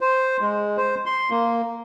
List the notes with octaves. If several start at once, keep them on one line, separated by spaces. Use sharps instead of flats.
C5
G#3
C5
C6
A#3